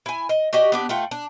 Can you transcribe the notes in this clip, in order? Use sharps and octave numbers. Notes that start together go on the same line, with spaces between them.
E4 G#5
D#5
F#4 G4 D5 D#5
B3 D4 G4
A3 F4 F#5 G5
D4